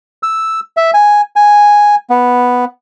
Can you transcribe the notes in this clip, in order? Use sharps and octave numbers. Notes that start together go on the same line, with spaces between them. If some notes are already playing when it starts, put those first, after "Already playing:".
E6
E5
G#5
G#5
B3